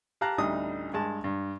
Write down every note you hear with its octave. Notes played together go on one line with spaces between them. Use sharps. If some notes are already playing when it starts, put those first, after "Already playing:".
G4 F5 A5 A#5 F#6
A1 D2 G3 D#4 D#6
G2 G#3 A5
G2